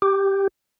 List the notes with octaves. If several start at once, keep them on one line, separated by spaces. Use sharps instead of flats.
G4